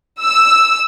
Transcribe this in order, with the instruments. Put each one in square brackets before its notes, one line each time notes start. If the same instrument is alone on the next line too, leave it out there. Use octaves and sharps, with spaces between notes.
[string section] E6